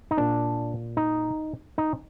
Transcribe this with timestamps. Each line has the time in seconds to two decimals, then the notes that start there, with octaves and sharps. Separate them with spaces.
0.11 D#4
0.18 A#2 D4
0.97 D#4
1.78 D#4